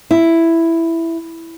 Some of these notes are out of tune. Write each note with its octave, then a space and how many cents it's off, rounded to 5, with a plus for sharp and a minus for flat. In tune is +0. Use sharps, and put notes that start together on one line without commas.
E4 +5